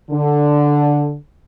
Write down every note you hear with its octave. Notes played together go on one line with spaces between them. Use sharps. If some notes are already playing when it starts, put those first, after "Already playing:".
D3